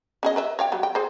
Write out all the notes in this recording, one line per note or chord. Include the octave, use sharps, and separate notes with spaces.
C#4 G#4 D#5
A#4 B4 E5
C#5 F5 G5
F#3 G3
G5
G#4 C5